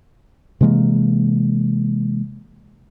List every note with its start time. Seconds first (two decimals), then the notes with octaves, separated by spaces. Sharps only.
0.61 C3 E3 G#3 A#3